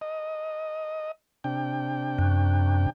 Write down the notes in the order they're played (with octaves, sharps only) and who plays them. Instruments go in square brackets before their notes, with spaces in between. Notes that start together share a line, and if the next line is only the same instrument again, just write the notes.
[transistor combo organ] D#5
C3 D4 G5
[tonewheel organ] F#2